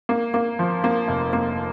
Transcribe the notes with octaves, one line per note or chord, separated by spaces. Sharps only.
A#3
A#3
F3
A#3
F1
A#3